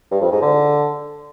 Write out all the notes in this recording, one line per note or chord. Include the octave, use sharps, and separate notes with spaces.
G2
F2
G#2
D3